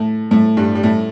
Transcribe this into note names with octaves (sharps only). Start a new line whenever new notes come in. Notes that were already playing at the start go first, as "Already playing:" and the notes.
Already playing: A2 A3
A2 A3
G2 G3
G3
A2 A3